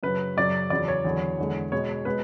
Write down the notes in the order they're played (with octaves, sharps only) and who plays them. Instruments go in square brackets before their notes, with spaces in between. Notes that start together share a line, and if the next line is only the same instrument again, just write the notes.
[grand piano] F#2 C#3 F#3 B4
F#2 C#3 F#3 D5
E2 C#3 F#3 D5
C#5
E2 D3 F#3
E2 D3 G#3
B2 G#3 C#5
B2 G#3 B4